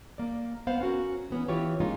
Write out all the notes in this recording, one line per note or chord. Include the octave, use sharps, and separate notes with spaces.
A#3 D5
B3 C5 F5 F#5
C#4 F#4 A#4
E3 B3 C#4
E3 F4 G4 C#5
G#3 A#3 C#4 D#4 F4